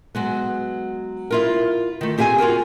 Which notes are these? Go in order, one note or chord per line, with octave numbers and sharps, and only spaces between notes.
F#3 G#3 B3
E4 F4 A#4
D#3 A3
C4 G4 G#4 G5 G#5
F4 F#4 A#4 G5